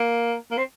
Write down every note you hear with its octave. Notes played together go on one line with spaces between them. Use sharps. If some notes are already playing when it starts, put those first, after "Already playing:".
Already playing: A#3
A#3
C4